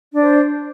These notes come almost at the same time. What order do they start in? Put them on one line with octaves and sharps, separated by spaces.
D4 D5 C5